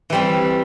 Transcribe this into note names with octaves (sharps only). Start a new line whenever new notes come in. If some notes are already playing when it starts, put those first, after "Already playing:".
E3 G3 C4